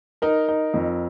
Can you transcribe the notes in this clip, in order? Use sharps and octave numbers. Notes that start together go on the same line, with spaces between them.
D#4 A#4
D#4
F2